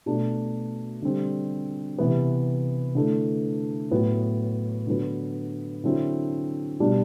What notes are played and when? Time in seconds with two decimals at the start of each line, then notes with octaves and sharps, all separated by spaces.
0.06 B2 A3 D4
1.02 D3 G3 C4
1.98 C3 E3 B3
2.95 D3 A3 E4
3.91 A2 F#3 B3
4.87 D3 F#3 B3
5.84 D3 F#3 C4 E4
6.80 B2 G3 D4